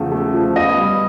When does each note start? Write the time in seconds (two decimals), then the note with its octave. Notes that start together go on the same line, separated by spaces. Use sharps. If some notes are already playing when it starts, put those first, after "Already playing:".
Already playing: E2 C#3 F3 A3
0.12 A3
0.34 F3
0.55 B3 D#5
0.78 G3